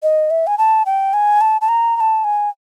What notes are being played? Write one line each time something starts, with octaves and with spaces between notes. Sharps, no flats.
D#5
E5
G#5
A5
G5
G#5
A5
A5
A#5
A#5
A5
G#5